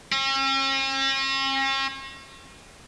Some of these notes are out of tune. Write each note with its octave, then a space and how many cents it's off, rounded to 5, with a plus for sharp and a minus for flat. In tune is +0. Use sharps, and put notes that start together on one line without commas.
C#4 -45